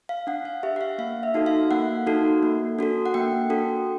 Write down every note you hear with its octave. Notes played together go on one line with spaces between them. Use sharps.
F5
D4 F#5
F5
G4 E5
F#5
F5
A#3 F5
E5
D#4 F#4 A4
F5
A#3 F#5
D#4 F#4 A4
A#3
D4 F#4 A4
F#5
A#3 G5
D4 F#4 A4